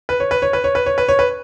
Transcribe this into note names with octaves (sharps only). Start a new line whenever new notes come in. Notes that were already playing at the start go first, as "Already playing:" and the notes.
B4
C#5
B4
C#5
B4
C#5
B4
C#5
B4
C#5
B4